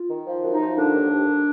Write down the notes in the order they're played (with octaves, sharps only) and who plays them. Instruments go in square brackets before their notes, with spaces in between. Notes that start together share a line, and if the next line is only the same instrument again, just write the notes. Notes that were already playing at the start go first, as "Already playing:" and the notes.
Already playing: [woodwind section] F4
D#3
F3
F#2
D#4
F3
D3 D4
D#2
D#2